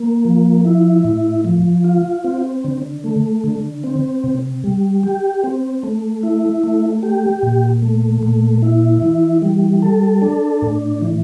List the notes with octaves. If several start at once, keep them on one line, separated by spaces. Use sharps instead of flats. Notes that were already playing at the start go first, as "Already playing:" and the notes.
Already playing: A#3
F3
E4
A2
F3
F4
C4
D3
A3
D3
C4
C3
G3
G4
C4
A3
E4
A3
G4
A#2
A3
A#2
E4
E3
G3
A4
D4
A2
E3